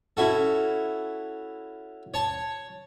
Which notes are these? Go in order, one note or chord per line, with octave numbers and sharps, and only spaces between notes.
C#4 E4 F#4 A4
C#5 A5